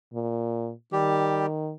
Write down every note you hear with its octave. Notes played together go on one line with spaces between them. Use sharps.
A#2
D#3 G3 G4